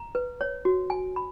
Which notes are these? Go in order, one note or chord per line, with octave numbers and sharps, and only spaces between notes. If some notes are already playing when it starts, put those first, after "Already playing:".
Already playing: A#5
B4
C#5
F#4
G#5
B5